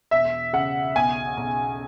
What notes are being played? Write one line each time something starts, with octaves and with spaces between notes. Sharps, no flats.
E1 E5
C#3 F#5
B1 G#5
B1